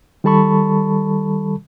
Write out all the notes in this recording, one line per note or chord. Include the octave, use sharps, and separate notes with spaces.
D#3 G3 A4 A5 B5 C#6